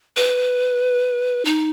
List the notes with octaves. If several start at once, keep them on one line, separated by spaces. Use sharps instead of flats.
B4
D#4